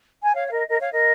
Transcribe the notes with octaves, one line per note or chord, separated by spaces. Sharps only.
G#5
C#5 F5
F5
A#4 D#5
A#4 D#5
C#5 F5
A#4 D#5